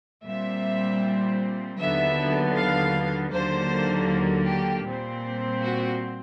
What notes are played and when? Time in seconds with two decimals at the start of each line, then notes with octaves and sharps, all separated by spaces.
0.24 A#2 G3 C4 E5
1.78 D#2 D3 F#3 B3 E5
2.55 F5
3.32 D#2 D3 F#3 A#3 C5
4.47 G4
4.85 A#2 G3 C4
5.62 F#4